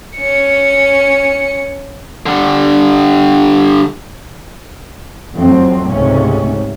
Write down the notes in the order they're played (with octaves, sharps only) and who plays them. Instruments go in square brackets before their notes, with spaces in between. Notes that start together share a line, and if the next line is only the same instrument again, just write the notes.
[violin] C#4 C#7
[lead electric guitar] D3 G3
[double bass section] F2 A2 F#3 C4
C#2 G#2 C3 A3 C#4